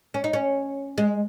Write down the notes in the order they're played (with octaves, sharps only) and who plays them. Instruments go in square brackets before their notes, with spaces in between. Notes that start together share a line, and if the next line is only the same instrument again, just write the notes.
[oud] C#4
D#4
C#4
G#3